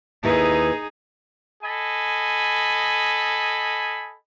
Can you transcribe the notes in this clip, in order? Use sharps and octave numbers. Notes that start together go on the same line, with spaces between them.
D#2 D#4 E4 G#4 B4
A4 D#5 G#5 B5